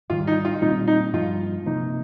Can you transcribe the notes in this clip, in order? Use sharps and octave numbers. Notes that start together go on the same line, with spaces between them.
G#2 D#3 G3 F4
D#4
F4
A#2 G3 C4 D#4
D#4
G2 F3 G#3 F4
C3 F3 A#3 D#4